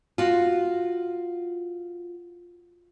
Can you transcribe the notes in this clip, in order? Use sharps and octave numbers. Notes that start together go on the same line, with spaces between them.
F4 F#4